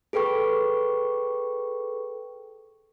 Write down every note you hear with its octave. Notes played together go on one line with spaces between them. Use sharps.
G#4 A4 B4 G5 C#6